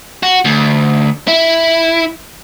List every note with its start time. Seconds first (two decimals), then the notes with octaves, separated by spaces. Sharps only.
0.23 F#4
0.45 D2
1.28 E4